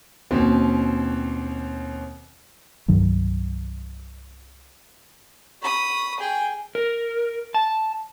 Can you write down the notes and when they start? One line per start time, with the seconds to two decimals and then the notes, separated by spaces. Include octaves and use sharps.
0.31 D#2 B2 C4 C#4
2.88 C2 G2 D#3 F#3
5.62 B5 C#6 D#6
6.20 G#4 G5 G#5
6.75 A#4
7.54 A5